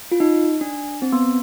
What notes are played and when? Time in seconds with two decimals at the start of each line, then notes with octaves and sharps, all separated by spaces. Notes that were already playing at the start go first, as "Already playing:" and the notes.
0.12 F4
0.20 D#4
0.61 D4
1.02 C4
1.12 B3